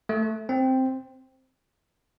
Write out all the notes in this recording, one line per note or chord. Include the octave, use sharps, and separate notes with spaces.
A3
C4